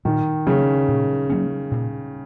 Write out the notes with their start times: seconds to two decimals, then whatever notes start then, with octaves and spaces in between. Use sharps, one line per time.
0.05 A#2 D#3
0.47 C#3 F#3 A#3 C#4
0.88 A#2
1.30 F#3 A#3 C#4
1.71 A#2